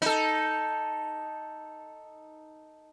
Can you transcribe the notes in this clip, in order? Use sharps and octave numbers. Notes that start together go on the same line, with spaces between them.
D#4 A4